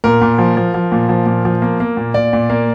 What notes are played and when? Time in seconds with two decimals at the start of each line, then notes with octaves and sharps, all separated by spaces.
0.04 A#2 A#4
0.21 A#2
0.38 F3
0.57 F3
0.74 F3
0.92 A#2
1.09 F3
1.26 A#2
1.45 F3
1.62 A#3
1.80 A#3
1.97 A#2
2.14 A#2 D5
2.33 A#2
2.50 A#3